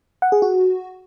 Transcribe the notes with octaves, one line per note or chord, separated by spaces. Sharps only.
F#5
G#4
F#4